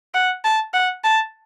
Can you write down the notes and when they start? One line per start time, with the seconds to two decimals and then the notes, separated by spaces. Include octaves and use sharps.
0.14 F#5
0.44 A5
0.73 F#5
1.04 A5